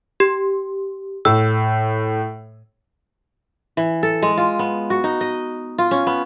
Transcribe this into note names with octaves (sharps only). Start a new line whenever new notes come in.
G4
A2 E6
E3
A4
G#3
F4
B3
F#4
D#4
D#5
F4
C#4
B3